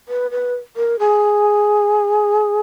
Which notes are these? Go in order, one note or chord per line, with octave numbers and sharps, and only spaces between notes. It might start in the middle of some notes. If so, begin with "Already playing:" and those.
B4
B4
A#4
G#4